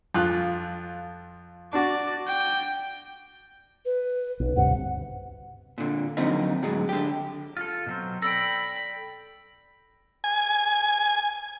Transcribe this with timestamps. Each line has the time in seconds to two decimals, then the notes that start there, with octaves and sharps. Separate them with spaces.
0.14 F2 F4 F#6
1.73 D4 F#4 D5
2.27 G5
3.85 B4
4.40 B1
4.57 D2 G2 C3 F#5
5.78 A#2 D3
6.17 F2 D3 F#3 A#3 C4 D#4
6.62 D2 A2 F#3 G#3
6.89 D3 G4
7.57 F4 A4
7.86 B2 F#3 C4
8.22 A4 D5 G5 B5 A#6
10.24 G#5